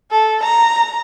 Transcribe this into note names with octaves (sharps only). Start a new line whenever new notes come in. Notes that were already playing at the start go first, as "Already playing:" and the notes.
A4
A#5